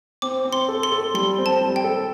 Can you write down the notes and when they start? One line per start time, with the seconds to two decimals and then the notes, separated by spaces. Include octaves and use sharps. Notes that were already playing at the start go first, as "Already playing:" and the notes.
0.22 C4 D6
0.45 C4
0.53 C6
0.68 A4
0.83 C6
0.92 A4
1.14 G3 C6
1.38 C4
1.46 A5
1.61 G3
1.76 G5
1.84 A4